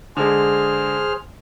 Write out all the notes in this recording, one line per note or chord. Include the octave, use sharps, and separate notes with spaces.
D3 G#3 G#4 C5 F6